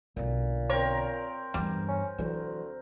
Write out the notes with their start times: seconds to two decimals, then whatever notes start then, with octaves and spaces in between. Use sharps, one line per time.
0.17 B1 A#2 D3
0.70 C4 A#4 C#5
1.54 E2 G2 G3
1.88 C#4
2.18 D2 E3 F#3